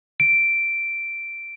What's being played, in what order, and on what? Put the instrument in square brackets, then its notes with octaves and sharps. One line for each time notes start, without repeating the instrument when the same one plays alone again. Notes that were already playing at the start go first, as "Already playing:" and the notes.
[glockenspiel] D7